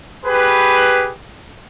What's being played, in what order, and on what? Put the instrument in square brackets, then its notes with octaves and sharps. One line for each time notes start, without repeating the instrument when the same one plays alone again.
[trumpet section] G4 G#4 B4